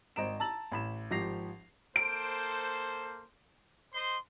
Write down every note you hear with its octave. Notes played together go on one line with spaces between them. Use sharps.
G#1 C5 D#5 A#5 D7 E7
A5 A#5 E6 A6 F#7
A1 B5 E7
G#1 F3 G4 A#6 C7 F7
A#3 A4 C5 D7
C5 D#5 C6